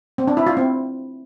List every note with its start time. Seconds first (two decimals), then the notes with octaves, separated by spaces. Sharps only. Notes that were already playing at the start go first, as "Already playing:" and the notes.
0.18 C4
0.27 D4
0.37 E4
0.47 F4
0.57 C4